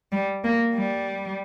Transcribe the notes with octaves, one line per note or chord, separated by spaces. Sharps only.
G3
A#3
G3